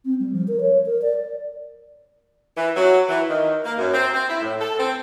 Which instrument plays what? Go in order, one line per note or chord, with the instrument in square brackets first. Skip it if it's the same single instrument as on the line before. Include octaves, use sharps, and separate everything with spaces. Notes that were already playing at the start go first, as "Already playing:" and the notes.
[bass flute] C4
G3
F3
A#4
C#5
A#4
D5
[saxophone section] E3
F#3
E3
D#3
A#3
F#2
C4
C4
E4
A2
A4
C4